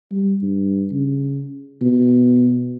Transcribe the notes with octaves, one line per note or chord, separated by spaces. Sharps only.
G3
G2
C#3
B2